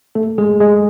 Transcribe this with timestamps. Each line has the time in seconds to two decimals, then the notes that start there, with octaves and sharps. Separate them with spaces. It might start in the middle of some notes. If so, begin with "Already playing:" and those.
0.15 A3 A4
0.38 G#3 G#4
0.60 G#3 G#4